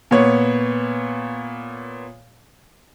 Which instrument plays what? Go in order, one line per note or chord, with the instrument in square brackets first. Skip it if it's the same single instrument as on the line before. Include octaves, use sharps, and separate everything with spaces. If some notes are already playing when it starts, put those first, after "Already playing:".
[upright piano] A#2 B3 C#5